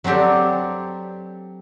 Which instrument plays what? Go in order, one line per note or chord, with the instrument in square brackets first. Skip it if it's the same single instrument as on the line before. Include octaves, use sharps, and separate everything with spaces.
[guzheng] F#3 C4 D4 G4 A4